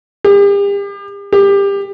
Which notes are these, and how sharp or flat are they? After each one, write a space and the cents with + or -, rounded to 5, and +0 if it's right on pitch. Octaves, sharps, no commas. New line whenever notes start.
G4 +40
G4 +25